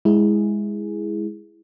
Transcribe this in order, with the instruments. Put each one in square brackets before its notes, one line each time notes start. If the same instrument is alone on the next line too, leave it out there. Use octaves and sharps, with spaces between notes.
[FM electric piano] G#3 E4 G#4